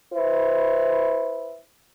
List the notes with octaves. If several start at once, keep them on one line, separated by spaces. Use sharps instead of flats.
E4 B4 C5